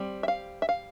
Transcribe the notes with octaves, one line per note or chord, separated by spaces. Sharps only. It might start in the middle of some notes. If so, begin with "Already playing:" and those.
Already playing: G3 C4
E5
F5
E5
F5